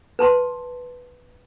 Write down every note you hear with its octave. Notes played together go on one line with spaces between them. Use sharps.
B4 A5 C6